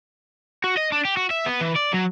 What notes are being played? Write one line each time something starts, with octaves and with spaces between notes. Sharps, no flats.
F#4
D#5
D4
G4
F#4
E5
B3
E3
D5
F#3